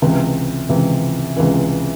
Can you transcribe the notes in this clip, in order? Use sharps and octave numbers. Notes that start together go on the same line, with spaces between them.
C#2 C3 E3
C#2 C3 E3
C#2 C3 E3